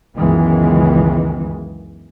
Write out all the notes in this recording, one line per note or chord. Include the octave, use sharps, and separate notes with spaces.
C#2 F#2 D#3 E3 G#3 B3